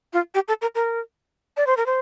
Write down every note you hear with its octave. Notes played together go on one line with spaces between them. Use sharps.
F4
G4
A4
A#4
A#4
D5
C5
A#4
C5